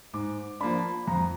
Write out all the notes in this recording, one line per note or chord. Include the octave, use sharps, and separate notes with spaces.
G#2 D6
F3 A#3 D4 B5
F2 A#5